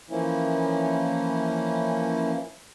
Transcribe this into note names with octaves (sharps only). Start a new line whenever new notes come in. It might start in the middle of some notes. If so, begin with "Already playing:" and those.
E3 F3 A#3 C#4 E4